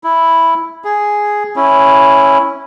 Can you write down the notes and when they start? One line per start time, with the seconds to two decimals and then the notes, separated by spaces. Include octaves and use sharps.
0.04 E4
0.84 G#4
1.56 C#4 E4